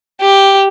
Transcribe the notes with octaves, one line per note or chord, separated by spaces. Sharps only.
G4